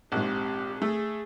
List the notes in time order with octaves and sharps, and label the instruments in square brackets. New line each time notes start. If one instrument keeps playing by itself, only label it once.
[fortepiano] A#1 G#2 [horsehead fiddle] C4 G4
[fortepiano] A3 [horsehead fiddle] G#4